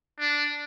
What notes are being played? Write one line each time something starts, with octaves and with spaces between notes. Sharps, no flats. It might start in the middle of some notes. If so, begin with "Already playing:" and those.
D4